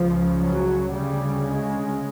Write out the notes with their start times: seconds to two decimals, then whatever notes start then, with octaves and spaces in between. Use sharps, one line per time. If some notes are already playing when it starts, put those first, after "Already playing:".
Already playing: C#2 C#3 F3
0.38 F#3
0.92 D2 C#3 G3
1.47 G#3